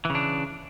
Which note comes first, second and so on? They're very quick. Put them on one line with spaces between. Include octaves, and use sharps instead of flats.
E3 C#3 D4